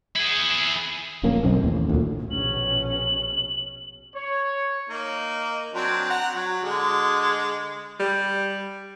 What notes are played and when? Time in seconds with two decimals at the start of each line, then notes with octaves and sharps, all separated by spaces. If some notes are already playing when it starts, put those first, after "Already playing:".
0.15 E4 G#4
1.23 D1 A#1 A#3 C#4
1.43 B1 F#2 C4
1.59 A1 D#2
1.89 D2 A#2
2.31 A#1 B2 C#4 F#7
4.14 C#5
4.90 A#3 D#4
5.75 F#3 C4 D4
6.10 F#5 A#5
6.35 F#3
6.64 D3 G#3
8.00 G3